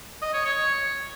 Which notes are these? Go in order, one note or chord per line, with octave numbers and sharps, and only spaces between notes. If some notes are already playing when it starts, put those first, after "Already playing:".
D#5
C#5
C#5